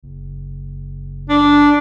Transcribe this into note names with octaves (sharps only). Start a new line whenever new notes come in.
F#1
D4